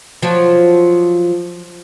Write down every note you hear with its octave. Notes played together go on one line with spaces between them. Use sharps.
F3 F#3